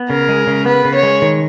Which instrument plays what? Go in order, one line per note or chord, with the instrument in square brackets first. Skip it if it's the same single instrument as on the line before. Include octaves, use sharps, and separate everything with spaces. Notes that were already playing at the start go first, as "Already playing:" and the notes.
Already playing: [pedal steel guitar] B3
[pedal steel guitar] C#3 [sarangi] A#4
[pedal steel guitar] G#3
C#3
[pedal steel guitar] B3 [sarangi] B4
[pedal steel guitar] C#3
[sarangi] C#5
[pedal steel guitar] G#3
D#3